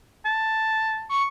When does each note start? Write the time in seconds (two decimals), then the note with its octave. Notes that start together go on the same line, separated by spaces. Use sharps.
0.25 A5
1.09 C#6